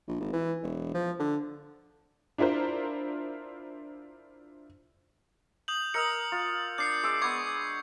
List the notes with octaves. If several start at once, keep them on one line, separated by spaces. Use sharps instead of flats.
A#1
G#1
E3
E1
F3
D3
D4 E4 F4 A#4 C5
D#6 G6 F#7
A#4 D#5 D#6 E6 C#7
F4
D4 G6 C7 C#7
G#3 D6 E6
G#3 B3 C#6 D6 G#6 C7